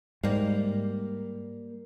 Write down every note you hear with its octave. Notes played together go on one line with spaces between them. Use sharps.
G#2 G3 A#3